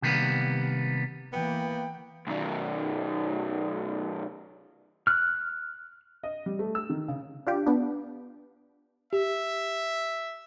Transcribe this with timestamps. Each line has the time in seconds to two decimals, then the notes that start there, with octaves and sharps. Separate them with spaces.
0.02 C3 D#3 G3 A#3 B3
1.33 E3 A#3 B3 G5
2.27 B1 D#3
5.07 F6 F#6
6.23 D#5
6.46 G3
6.59 A3
6.75 E6
6.90 D#3
7.08 C#3
7.47 D4 F4 G4
7.66 B3 D4
9.13 G4 E5